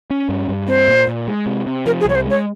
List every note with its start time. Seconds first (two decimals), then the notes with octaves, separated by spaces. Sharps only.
0.10 C#4
0.29 G2
0.49 G2
0.68 C4 C5
0.88 A#2
1.08 A#2
1.28 G#3
1.46 C3
1.66 C3
1.86 F3 A#4
2.01 G#4
2.05 C2 C#5
2.15 C5
2.25 G#3 C#5